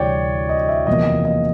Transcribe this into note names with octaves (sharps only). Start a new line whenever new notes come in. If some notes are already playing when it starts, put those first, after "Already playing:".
Already playing: D2 C3 E3 G3 C4 C#5 D5 G5
D#5
E5
F#1 E2 C3 F3 A#3 D#5
D#5